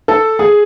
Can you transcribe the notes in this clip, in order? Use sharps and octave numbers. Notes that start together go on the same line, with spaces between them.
A4
G#4